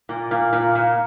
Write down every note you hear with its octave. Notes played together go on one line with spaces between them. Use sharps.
A#2
A#2
A#2
A#2